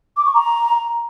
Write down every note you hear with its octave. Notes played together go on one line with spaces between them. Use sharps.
D6
C#6
A#5